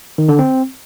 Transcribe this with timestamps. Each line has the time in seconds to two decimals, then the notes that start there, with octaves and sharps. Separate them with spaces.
0.18 D#3
0.29 D3
0.39 C4